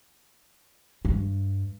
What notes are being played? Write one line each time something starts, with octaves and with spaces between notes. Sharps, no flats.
G2